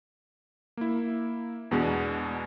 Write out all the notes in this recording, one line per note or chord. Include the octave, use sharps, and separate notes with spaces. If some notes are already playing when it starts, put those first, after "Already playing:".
A#3 E4
E2 B2 G#3 B3 D4